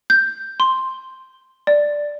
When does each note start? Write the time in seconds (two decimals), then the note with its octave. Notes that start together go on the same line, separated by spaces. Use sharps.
0.10 G6
0.60 C6
1.67 D5